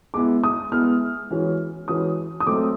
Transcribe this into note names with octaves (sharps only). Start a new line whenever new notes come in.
G#3 B3 E4 D6
D#6
G#3 B3 E4 F6
E3 G#3 C#4 F#4 B4
E3 G#3 C#4 F#4 B4 D#6
D#6
F#3 A3 C4 D6